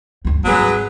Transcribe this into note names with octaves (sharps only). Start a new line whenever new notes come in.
D2 G2
G#1 F#3 G3 G#4 B4